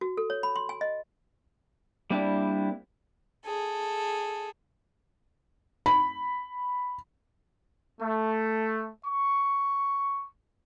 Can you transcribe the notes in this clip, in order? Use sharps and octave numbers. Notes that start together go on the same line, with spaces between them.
F#4
A4
C#5
B5
C6
G#5
D#5
G3 A#3 C4 D4 E4
G#4 A4
B5
A3
C#6